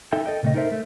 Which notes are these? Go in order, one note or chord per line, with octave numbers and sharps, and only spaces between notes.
D#4 A4 E5 G5
A4 D#5 G5
A#2 C#3 A3 C4 D#5
D#4 A4 A#4 C5 E5
A3